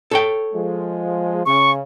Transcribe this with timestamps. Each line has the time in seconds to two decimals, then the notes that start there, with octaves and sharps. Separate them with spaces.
0.11 A4 C#5 G5
0.54 F3 G#3
1.46 C#3 C#6